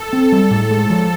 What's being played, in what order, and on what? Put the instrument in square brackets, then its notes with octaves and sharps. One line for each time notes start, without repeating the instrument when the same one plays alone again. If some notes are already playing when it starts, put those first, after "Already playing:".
Already playing: [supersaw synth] A4
[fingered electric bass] C4
G3
[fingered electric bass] A2 [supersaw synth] A4
[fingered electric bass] G#3
F3